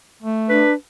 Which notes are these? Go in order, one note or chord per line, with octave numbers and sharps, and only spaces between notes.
A3
D4 B4